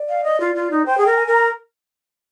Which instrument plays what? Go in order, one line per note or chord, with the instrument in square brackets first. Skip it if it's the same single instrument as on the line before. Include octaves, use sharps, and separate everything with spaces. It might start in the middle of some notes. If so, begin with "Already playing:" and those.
Already playing: [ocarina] D5
[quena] F5
D#5
F4
F4
D#4
[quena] C5 [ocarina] G5
[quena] G#4 [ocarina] G5
[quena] A#4
[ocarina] G5
G#5
[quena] A#4 [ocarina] A#5